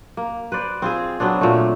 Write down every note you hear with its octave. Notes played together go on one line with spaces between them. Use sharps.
A#3
B4 C5 D5
C4 F4 G#4
F#3 B3 C4 D4
A#2 A3